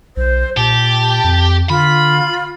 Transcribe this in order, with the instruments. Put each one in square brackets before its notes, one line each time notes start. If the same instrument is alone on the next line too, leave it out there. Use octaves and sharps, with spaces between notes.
[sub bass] B1 [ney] C5
[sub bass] A#2 [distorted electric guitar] G4 [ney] A5
[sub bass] F2
[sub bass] D3 [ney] F4 [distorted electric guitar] B5